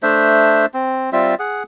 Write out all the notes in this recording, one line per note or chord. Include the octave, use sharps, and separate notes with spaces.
A3 D4 C5 E5
C4
G3 C4 F4 E5
G#4 F#5